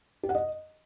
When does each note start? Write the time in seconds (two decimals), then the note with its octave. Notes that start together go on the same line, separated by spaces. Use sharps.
0.23 G4
0.29 F#5
0.35 D#5